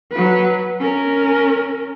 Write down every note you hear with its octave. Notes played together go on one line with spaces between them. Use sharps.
F#3 B4
C#4 A#4